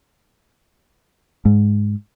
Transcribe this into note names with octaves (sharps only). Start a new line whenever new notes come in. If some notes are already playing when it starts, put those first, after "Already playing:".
G#2